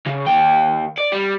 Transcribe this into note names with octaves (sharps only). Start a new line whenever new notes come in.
C#3
D#2 G5
D5
G3